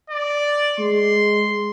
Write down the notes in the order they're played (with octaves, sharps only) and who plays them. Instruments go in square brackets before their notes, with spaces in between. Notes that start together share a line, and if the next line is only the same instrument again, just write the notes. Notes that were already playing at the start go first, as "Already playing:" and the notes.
[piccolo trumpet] D5
[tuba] G#3 [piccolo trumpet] C6